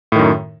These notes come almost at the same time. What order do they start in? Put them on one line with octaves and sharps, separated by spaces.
A2 D#3 F#2